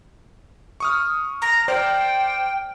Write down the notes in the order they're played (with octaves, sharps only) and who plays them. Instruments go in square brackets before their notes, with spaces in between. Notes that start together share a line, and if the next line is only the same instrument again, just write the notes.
[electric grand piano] C#6 D#6 F6
[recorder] A#5
[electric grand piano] C5 D5 F6 [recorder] G5